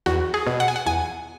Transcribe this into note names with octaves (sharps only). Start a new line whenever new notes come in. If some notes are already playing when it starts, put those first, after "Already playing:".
E2 F#4
G#4
B2
F#5
G#5
F#5
E2 G#5